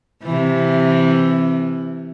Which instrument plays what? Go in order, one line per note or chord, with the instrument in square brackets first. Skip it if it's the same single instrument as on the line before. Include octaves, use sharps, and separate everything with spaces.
[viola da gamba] C3 E3